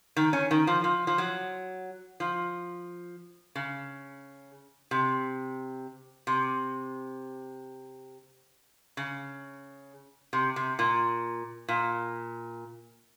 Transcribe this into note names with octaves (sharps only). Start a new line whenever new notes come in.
D#3
C#4
D#3
F3
F3
F3
F#3
F3
C#3
C3
C3
C#3
C3
C3
A#2
A#2